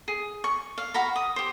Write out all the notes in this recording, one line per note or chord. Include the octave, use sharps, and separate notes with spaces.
G#4
C#6
F5
F#4 F5 A#5 B5
D#6
G4 C5